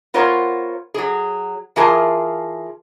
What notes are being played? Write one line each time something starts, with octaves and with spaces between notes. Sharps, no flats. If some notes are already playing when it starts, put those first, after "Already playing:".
B3 F4 A#4 C5 C#5 F#5
F#3 G#4
E3 F4 G#4 A#4 G#5 A5